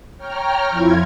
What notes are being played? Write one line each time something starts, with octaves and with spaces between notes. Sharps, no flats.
C#5 G5 A#5 F6
F2 F3 E4 F4 G#6